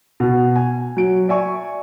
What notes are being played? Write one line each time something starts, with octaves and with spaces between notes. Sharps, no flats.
B2
G#5
F#3 D7
D5 E5 G#5 C#6